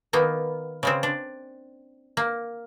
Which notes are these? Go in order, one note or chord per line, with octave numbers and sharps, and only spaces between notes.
D#3 A#3 B3
C#3 G#3 C4
D4
A#3